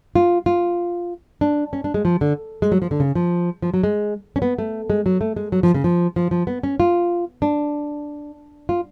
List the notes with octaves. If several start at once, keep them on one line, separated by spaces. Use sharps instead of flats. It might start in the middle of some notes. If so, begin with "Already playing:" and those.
F4
F4
D4
C#4
D4
G#3
F3
D3
G#3
F#3
F3
D3
C#3
F3
F3
F#3
G#3
C#4
B3
A3
G#3
F#3
A3
G#3
F#3
F3
C#3
F3
F3
F3
B3
C#4
F4
D4
F4